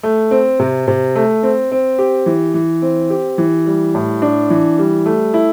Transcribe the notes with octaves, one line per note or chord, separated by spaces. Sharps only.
A3
C4
C3
C3
A3
C4
C4
G4
E3
E3
C4
G4
E3
G3
A2
D4
E3
G3
A3
E4